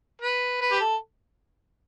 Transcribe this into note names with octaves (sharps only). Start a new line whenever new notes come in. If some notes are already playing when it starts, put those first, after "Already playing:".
B4
B4
G4
A4